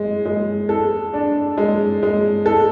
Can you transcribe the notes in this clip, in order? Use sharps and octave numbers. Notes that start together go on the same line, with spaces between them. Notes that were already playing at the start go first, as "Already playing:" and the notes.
Already playing: G#3
G#3
A4
D4
G#3
G#3
A4